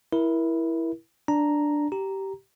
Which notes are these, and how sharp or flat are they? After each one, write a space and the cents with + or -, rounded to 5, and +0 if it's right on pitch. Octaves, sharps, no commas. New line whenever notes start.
E4 +0 A#4 +30
D4 +0 A#5 +0
G4 -15 A#5 +0